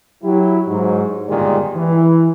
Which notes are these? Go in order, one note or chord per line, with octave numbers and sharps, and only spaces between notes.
F#3 E4 G4
G#2 F#3 D#4
G1 A#2 D#3 G#3 G4 D5
E3